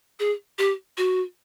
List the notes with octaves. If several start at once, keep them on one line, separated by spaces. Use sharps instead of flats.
G#4
G4
F#4